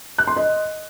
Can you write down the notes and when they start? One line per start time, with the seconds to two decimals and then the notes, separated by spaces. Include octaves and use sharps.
0.18 F#6
0.27 C6
0.36 D#5